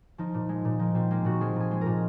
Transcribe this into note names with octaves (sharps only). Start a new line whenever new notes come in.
F3 D#4
A#2
G#3
A#2
F3 D#4
A#2 C4
G#3 A#3
A#2 F#4
F3 G#4
A#2 G#4
G#3
A#2 A#4